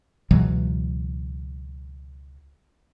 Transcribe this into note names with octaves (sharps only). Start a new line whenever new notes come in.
C#2 B2 E3 F#3